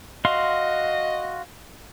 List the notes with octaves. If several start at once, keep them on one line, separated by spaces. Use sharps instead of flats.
F#4 D#5 F5 C6